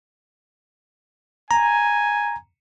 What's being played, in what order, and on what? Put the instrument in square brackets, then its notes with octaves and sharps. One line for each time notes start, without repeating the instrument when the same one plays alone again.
[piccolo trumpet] G#5 [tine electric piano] A#5